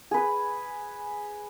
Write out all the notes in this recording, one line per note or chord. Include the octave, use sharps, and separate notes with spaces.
G#4 B4